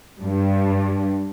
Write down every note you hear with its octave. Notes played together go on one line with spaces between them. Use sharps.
G2